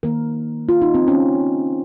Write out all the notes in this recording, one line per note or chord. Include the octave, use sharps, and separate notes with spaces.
D#3 A#3 A#4
F4
D#4
C4
C#4